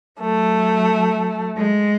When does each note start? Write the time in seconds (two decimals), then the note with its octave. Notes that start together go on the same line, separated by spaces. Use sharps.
0.20 F#3 A3
1.57 G#3